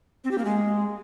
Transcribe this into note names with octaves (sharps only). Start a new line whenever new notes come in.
C4
G4
A#3
G#3